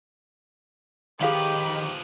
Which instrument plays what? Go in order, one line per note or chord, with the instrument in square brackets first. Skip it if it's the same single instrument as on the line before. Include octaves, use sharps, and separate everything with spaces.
[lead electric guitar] D#3 [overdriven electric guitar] F3 B4 [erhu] G4 [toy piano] G#4 F5 F#5